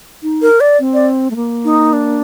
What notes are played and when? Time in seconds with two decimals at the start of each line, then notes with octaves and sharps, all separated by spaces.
0.23 D#4
0.42 A#4
0.60 D5
0.79 C4
0.94 D5
1.31 A3
1.36 A#3
1.65 D#4
1.93 D4